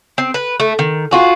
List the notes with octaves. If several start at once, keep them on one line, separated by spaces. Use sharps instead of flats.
C4
B4
A3
D#3
F4 F#4 G#4